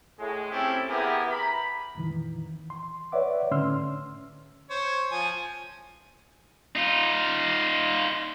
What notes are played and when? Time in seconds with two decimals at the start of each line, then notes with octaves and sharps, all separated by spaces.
0.18 A2 G#3
0.51 C4 C#4 E4 G4 A4
0.89 B3 E4 G4 G#4 A#4
1.30 A#5 B5
1.95 F2 A#2 D#3 E3
2.70 C6
3.12 B4 C#5 D5 E5 F#5 D6
3.51 A2 D3 C#4 C6 E6 F6
4.70 C5 C#5
5.12 F3 G#5
6.75 D#4 F4